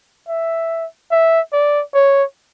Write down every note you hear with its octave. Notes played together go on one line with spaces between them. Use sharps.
E5
E5
D5
C#5